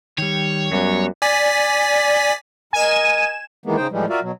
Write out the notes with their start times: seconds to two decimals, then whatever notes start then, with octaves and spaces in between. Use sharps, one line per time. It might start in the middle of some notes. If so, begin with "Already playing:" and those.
0.18 D#3 G3 C#5
0.72 F#2 F#3 G3 B3
1.22 D5 G#5 B6
2.73 A#4 D#5 G#5 E7
3.66 D#3 E3 G#3 A#3 B3
3.77 C#3 D#4 C5 G5
3.91 A2 E3 F3 G3 G#3
4.10 F4 F#4 A#4 D5 E5 F5
4.22 B2 F#3